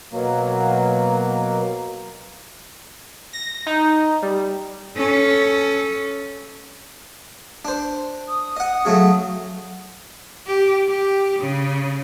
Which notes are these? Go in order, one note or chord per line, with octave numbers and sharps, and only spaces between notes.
B2 F#3 A#3
A#6
D#4
G3
C#4 A4
D4 C5
D#6
D#5 F#5
C#3 F#3 A3
G4
G4
C#3